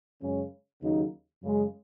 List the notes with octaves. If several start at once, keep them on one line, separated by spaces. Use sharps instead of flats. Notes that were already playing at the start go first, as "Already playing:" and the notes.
F#2 C#3 G#3 C#4
D#2 C#3 F#3 D#4
F#2 C#3 G#3